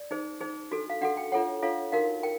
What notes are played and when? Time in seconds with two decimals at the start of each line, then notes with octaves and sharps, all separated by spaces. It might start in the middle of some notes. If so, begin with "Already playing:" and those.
Already playing: D5
0.11 D#4 G#4 C5
0.41 D#4 G#4 C5
0.71 D4 F#4 A4
0.90 F5
1.01 D4 F#4 A4 F#5
1.17 G5
1.32 D4 F4 A4 C#5 F#5
1.63 D4 F4 A4 C#5 F5
1.92 D#4 F#4 A#4 F5
2.23 A#4 G5